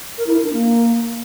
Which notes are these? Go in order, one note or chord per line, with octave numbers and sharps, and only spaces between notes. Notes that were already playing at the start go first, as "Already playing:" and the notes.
A#4
E4
A#4
D4
A#3